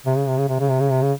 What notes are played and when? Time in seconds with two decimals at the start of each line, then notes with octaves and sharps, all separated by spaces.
0.06 C3
0.17 C#3
0.28 C3
0.38 C#3
0.49 C3
0.60 C#3
0.70 C3
0.80 C#3
0.91 C3
1.02 C#3